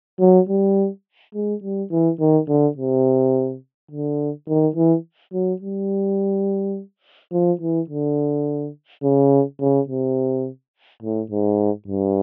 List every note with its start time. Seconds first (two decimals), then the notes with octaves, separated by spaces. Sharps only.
0.20 F#3
0.49 G3
1.35 G#3
1.63 G3
1.92 E3
2.20 D#3
2.48 D3
2.77 C3
3.91 D3
4.48 D#3
4.76 E3
5.34 F#3
5.62 G3
7.33 F3
7.61 E3
7.90 D3
9.03 C#3
9.61 C#3
9.89 C3
11.03 A2
11.31 G#2
11.88 G2